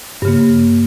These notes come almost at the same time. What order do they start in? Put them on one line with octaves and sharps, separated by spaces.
G2 C#3 A#3